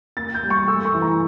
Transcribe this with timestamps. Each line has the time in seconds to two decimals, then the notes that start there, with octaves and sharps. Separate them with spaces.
0.17 A#3 A6
0.34 G6
0.43 G3
0.50 C#6
0.68 A3 E6
0.85 C#6
0.94 E3
1.02 A#5